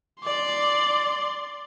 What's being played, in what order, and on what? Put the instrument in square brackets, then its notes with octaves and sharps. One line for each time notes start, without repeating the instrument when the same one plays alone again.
[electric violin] D5 C6